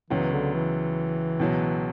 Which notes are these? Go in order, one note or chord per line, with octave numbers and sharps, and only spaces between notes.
C#2 C#3 E3 F#3 B3
D3
E3
C#2 B2 F#3